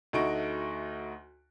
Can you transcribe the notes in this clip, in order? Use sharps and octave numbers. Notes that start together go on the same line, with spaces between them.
D2 A3 D#4 F#4 C#6 D7